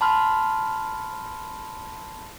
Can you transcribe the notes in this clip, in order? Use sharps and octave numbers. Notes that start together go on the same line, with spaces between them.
A5 B5 C6 F6